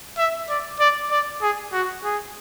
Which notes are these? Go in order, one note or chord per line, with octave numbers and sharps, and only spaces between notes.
E5
D5
D5
D5
G#4
F#4
G#4